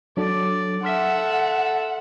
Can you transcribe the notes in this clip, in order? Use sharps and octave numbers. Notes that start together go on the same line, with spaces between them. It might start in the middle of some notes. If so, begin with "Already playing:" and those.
F#3 D4 A4 D5
A4 E5 F#5 C6 F6 B6